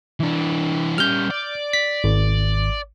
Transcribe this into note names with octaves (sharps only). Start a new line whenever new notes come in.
E3 D4
G3 C#4 F6 G6
D5
B6
G#1